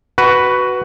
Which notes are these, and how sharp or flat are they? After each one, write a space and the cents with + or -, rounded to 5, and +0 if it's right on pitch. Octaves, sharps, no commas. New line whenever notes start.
F#4 +10 B4 +0